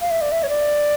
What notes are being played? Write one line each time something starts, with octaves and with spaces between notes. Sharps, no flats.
F5
E5
D5
E5
C#5
D5